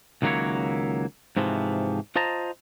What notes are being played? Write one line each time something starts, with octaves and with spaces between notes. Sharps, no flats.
C#2 D#3 F#3 A#3 E4 C#5
G#2 C3 E3 F3
F4 C5 D#5 A5 A#5